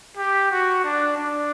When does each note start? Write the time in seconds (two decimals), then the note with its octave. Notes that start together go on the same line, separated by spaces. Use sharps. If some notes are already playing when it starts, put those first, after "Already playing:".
0.17 G4
0.51 F#4
0.84 D4
1.18 D4